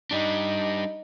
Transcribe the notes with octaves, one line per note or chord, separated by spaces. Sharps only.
G3 D4 D#4